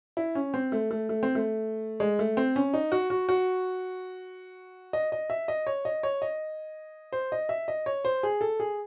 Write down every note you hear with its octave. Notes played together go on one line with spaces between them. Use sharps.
E4
C#4
C4
A3
A3
A3
C4
A3
G#3
A3
C4
C#4
D#4
F#4
F#4
F#4
D#5
D#5
E5
D#5
C#5
D#5
C#5
D#5
C5
D#5
E5
D#5
C#5
C5
G#4
A4
G#4